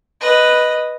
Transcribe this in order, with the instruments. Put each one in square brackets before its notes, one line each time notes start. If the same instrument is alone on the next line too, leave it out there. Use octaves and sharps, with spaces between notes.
[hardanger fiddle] B4 D#5